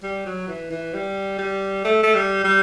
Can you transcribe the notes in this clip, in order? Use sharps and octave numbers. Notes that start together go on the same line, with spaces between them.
G3
F#3
E3
E3
G3
G3
A3
A3
G3
G3